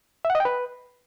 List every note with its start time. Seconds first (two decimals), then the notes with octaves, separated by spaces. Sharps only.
0.25 E5
0.30 F#5
0.35 D#5
0.40 G5
0.45 B4